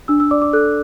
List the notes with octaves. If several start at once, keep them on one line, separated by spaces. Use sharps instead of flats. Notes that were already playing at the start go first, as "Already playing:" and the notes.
D4 E6
E6
D5 D6
D6
A4 F#6